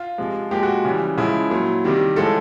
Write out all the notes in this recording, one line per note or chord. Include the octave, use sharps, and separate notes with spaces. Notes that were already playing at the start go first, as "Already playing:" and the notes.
Already playing: F4
C3 F3 G#3
A#2 F3 G#3 G4
F#4
C#3 E3 G3
C#3 F3 G#3 E4
A#2 F#3
C3 D#3 G3
A2 F3 G#3 A4